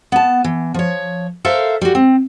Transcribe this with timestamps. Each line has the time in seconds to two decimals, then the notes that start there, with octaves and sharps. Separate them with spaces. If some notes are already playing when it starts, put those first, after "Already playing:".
0.12 B3 A5
0.44 E3
0.74 F3 C#5
1.45 A4 A#4 C5 E5 F5
1.81 G3 F#4
1.95 C4